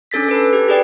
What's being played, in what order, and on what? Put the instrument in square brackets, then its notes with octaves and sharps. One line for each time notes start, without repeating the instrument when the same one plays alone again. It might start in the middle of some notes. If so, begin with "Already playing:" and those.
[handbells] C#4 D4 A4 A6 B6
A4 B4
G4
G4 G#4 B4 D5 G5